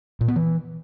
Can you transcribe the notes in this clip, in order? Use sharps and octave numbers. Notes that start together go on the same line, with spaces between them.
A#2
B3
E3